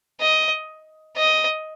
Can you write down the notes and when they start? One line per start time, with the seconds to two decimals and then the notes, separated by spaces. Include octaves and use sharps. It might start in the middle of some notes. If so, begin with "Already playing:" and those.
0.20 D#5
1.16 D#5